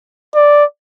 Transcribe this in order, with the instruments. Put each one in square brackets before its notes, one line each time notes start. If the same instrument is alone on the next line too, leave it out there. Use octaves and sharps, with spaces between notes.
[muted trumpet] D5